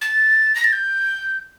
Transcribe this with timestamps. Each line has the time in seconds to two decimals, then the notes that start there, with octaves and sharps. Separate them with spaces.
0.01 A6
0.55 A#6
0.64 A6
0.73 G6